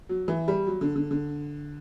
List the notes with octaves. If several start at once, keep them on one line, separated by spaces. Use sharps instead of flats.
F#3
E3
G3
F#3
D3
D3
D3